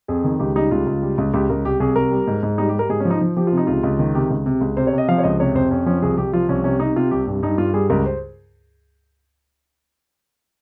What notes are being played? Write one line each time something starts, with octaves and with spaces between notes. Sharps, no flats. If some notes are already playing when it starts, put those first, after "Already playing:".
F2 G#4
D#3
C#2 G4
G3 D#4
C#2 F4
C#2
G3
C#2
C#2 G4
C#2 A#4
C2 G4
C2 G#4
C2 A#4
G3
G#2
G#2
G3 D#4
G4
G3
A#4
G#2 G#4
C#4
F3
D#4
F3
F3 G4
F4
C3
D#4
C#2 F4
C#2
D#3
C3 G4
C#2
C3
C#2
C3 C5
C#5
C3
D#5
F3 F5
C#5
C#2 D#5
C3 C#5
F2 C5
F2 C#4
F3 C#4
C2 G#4
C2 G4
F3 F4
C2 C#4
C3 C#4
C3 D#4
C3 F4
C2 G4
G2
G2 D#4
G2 F4
G3 G#4
C#2 A#4
C5